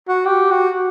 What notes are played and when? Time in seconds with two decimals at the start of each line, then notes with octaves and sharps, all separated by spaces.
0.09 F#4
0.26 G4
0.51 F#4